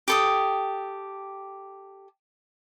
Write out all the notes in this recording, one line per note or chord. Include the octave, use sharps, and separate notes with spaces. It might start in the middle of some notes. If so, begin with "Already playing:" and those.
G4 A4 D#6